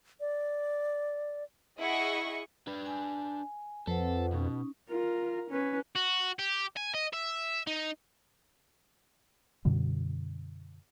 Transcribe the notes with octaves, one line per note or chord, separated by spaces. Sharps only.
D5
E4 G#4 D#5 F#5 C#6
D4 B4
G#5
F2 A4 B4 C5 F#5
B2 C#4 D#4
F4 A#4
C#4 B4
F#4
G4
G#5
D#5
E5
D#4
F#2 B2 D3 G3